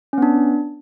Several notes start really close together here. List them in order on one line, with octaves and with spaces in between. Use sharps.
C#4 B3 D4